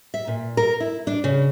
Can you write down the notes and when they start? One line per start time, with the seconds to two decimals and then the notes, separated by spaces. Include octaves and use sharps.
0.14 E5
0.27 A#2
0.57 A#4
0.80 E4
1.07 D4
1.24 C#3